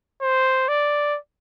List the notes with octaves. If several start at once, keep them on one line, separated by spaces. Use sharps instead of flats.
C5
D5